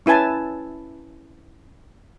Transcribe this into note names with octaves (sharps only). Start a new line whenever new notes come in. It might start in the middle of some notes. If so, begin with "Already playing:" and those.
C#4 E4 B4 G#5 A5